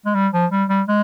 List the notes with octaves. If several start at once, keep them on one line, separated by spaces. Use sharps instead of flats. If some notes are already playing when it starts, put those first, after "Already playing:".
G#3
G3
F3
G3
G3
G#3